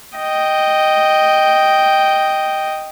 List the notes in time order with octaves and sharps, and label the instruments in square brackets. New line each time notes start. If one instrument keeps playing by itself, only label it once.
[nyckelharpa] D#5 G5